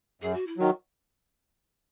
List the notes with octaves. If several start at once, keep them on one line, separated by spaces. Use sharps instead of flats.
F#2 G#4
F#4
E4
D#3 F#3 F#4